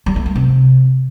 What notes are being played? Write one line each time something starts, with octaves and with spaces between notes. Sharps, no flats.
G3
A3
G3
C3